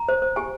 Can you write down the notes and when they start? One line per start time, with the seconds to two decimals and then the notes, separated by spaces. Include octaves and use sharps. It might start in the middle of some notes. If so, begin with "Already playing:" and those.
Already playing: A#5
0.09 C5
0.22 C5
0.36 G4 G#5